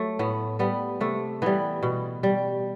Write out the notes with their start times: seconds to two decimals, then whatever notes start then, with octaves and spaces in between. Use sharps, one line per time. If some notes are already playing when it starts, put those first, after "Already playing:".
Already playing: F#3 A3
0.19 A2 B3
0.59 G3 B3
1.00 C3 A3
1.42 E3 G3 B3
1.83 B2
2.23 G3